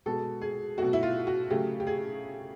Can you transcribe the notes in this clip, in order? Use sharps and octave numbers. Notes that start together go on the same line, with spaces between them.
B2 G#3 A4
G#4
B2 F#3 A3 F#4
E4
F4
F#4
C#3 F#3 A3 G4
G4
G#4